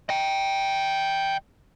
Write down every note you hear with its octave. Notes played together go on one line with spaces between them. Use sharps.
D#5 G5